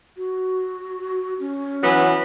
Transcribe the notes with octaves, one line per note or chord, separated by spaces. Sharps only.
F#4
C#4
E3 F#3 B3